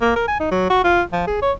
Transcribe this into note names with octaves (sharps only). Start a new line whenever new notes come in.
A#3
A#4
G#5
D#4
F#3
F#4
F4
F3
G#4
C#5